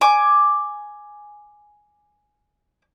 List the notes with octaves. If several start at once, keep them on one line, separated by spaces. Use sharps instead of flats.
G#5 D6